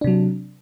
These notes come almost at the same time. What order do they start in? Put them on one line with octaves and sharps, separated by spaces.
D4 C3 F#3